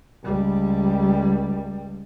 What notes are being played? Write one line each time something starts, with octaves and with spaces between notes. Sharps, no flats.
C#2 G3